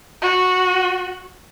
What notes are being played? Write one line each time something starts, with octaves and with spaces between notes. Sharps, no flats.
F#4